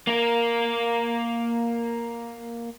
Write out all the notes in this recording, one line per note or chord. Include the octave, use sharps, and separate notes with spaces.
A#3 A#4